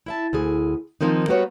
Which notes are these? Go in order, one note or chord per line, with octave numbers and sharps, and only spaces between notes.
E4 E5 A5
D2 E4 G#4
D#3 F3 A#3 C4 D#4
G3 A#3 B3 F#4 B4 C#5